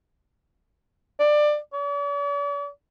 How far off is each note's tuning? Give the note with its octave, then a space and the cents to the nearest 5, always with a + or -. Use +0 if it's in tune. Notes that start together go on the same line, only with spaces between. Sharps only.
D5 +20
D5 -45